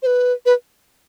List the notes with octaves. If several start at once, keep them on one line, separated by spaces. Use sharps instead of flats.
C5
B4
B4